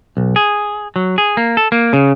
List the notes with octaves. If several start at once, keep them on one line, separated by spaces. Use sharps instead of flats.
B1
G#4
F#3
G#4
A#3
A4
A#3
C#3